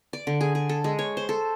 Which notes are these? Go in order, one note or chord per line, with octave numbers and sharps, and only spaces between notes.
D5
D3
G#4
G#4
A4
G#3
C#5
C5
A4